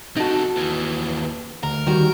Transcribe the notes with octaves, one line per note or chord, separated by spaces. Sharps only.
C3 D#4 F#4 A4
D#2 E3
D2 A#4
D#3 G3 F#4